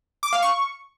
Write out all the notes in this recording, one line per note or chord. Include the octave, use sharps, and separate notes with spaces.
D6
F5
C#6